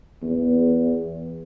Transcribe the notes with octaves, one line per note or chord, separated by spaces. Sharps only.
E2